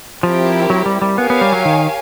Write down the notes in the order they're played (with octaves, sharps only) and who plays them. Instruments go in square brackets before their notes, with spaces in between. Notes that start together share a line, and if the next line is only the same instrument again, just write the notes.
[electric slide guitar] F3 [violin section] C4 E4 G4 A#4
[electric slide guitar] F#3
G3
G3
[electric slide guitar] B3 [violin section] G4 A#4 C#5 F5 G#5
[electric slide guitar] B3
G3
F#3
D#3